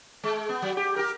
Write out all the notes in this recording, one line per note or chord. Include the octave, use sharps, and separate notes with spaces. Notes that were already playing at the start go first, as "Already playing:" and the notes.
G#3
B3
F#3
G4
G4 A#4